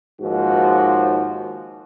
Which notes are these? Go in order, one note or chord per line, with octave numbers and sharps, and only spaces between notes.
D#2 G#2 F3 F#4